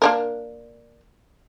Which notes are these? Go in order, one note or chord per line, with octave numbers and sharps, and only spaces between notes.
A#3 D4 A#4